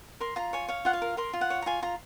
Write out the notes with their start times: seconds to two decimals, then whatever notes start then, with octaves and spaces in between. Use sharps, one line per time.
0.20 A#4 C6
0.36 F4 A#5
0.53 C#5 G#5
0.68 C#5 F5
0.85 F4 F#5
0.93 F5
1.02 A#4
1.17 A#4 C6
1.33 F4
1.41 F#5
1.50 C#5
1.62 A#5
1.66 F4 G#5
1.82 F4 A#5